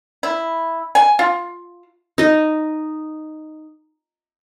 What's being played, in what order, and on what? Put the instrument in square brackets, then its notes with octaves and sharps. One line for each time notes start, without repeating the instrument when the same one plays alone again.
[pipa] E4
G#5
F4
[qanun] D#4 D#5